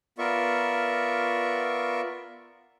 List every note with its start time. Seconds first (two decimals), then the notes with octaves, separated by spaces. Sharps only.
0.18 B3 F4 A#4 D5 E5 C#6